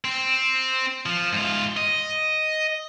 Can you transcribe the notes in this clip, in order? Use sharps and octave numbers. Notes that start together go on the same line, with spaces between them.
C4
F3
G#2 F4
D#5